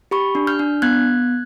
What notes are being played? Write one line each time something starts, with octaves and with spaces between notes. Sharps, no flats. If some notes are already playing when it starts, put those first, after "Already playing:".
G4 B5 C#6
D4
F6 G6
D4
B3 F#6 G#6